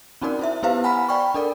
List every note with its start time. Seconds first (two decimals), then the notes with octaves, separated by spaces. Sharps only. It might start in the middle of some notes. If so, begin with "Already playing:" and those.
0.21 C4 C#4 D#4 F#4 A#4 D5
0.39 E4 C5 E5
0.63 B3 E4 G4 B4 C5 F5
0.84 F#5 G#5 A#5 B5 F6 B6
1.09 D5 G5 B5 C#6
1.34 D4 A4 A#4 D5